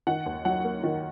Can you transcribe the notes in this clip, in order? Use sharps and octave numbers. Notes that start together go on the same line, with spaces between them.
D#3 F#5
D#2
F#3 F#5
A#3
D#3